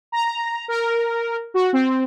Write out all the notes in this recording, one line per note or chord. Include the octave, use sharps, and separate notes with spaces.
A#5
A#4
F#4
C4